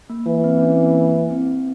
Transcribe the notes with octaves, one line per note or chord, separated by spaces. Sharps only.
A#3
E3 A#3
C4
C#4
C4
A#3
C4